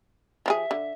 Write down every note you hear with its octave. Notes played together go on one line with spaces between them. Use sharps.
F3 F4 G#4 E5
D3